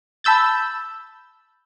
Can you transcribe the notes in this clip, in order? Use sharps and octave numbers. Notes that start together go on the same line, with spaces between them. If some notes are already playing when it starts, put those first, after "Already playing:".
A5 B5 E6 G6 A6